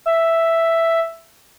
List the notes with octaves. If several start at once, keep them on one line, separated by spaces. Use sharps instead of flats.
E5